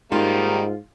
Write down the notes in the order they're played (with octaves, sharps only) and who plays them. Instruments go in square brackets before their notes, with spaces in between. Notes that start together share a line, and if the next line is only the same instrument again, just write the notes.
[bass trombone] G#2 [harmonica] D#3 G3 A#3 [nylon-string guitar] F4